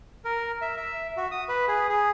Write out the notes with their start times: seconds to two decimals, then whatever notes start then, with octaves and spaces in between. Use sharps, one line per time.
0.25 A#4
0.61 E5
0.77 E5
1.17 F#4
1.31 D#6
1.49 B4
1.68 G#4
1.89 G#4